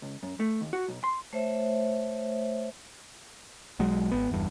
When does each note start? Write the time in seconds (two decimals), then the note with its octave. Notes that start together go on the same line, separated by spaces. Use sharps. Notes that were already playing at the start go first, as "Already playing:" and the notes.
0.02 C#2
0.23 F#2
0.40 A3
0.61 D#2
0.73 F#4
0.88 B1
1.04 C6
1.33 A3 C5 C#5 E5
3.79 B1 F#3 G#3
4.12 G#1 B3
4.30 G1 E2 G2